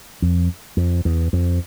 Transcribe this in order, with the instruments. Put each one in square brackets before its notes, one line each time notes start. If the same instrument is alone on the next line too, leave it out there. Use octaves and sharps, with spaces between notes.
[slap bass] F2
F2
E2
F2